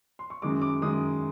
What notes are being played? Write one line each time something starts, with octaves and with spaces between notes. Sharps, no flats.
C6
C#6
F#2 D#3 G#3 D6
D6
F#2 D#3 G#3 D#6